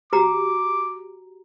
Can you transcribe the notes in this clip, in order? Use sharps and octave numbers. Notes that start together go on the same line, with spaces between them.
F#4 G4 A#5 D6